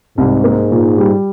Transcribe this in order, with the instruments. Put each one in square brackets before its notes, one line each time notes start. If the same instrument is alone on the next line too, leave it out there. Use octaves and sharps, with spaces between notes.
[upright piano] C2 [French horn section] G#2
[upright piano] A#3
A#2
G3